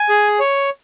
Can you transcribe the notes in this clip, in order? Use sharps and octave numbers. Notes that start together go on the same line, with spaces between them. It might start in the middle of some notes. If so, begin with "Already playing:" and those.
Already playing: G#5
G#4
C#5